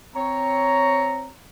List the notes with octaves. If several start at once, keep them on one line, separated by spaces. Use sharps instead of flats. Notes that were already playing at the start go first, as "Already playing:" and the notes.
C4 C#5 A#5